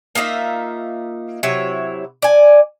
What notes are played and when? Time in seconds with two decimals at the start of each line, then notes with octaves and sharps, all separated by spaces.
0.15 A#3 D#4 F4 E5
1.43 C3 F#3 E4 C#5
2.22 D5 G#5